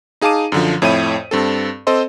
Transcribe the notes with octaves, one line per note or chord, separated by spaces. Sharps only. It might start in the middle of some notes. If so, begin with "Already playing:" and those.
D#4 G#4 F5 A5 D6 D#7
F#2 D3 F3
F2 A2 C#5 E5 B5 D#7
G2 C4 A4
C4 A4 C5 D#5 C6